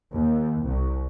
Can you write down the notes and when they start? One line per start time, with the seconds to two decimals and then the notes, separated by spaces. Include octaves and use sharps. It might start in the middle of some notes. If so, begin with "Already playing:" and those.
0.15 D#2
0.62 C2